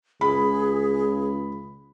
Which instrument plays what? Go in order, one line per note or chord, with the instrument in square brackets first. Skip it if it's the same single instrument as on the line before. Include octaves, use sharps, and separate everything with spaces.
[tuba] C#2 [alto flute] G#4 [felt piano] B5